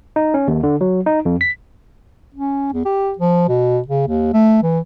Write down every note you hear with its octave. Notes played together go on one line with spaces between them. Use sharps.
D#4
C#4
D#2
D3
F#3
D#4
F2
B6
C#4
E2
G4
F3
B2
C#3
D#2
A3
E3